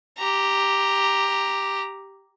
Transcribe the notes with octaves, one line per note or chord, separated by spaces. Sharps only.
G4 A#5